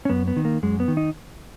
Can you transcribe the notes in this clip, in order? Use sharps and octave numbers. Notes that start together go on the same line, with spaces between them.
C#4
F#2 B3
B3
D#3
A#3
F#2 G#3
B3
D#3
D#4